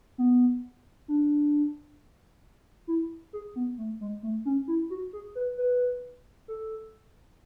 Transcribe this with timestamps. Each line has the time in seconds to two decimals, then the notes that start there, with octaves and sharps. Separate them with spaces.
0.18 B3
1.08 D4
2.87 E4
3.33 G#4
3.56 B3
3.78 A3
4.01 G#3
4.23 A3
4.45 C#4
4.68 E4
4.90 F#4
5.13 G#4
5.35 B4
5.58 B4
6.48 A4